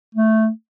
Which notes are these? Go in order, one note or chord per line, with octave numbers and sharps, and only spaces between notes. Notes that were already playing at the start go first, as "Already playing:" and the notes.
A3